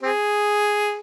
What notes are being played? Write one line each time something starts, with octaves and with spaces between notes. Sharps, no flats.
C4 G#4